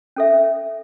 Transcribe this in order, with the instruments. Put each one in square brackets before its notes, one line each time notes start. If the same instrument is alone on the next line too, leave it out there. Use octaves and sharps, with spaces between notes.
[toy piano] C#4 A4 E5